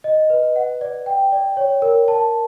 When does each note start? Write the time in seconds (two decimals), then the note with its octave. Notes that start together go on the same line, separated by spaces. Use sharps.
0.04 D#5
0.30 B4
0.56 F#5
0.81 D5
1.06 G5
1.32 D5
1.57 C#5
1.82 A#4
2.08 A5